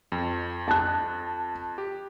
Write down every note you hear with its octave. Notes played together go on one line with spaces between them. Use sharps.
F2
A5 F#6
G4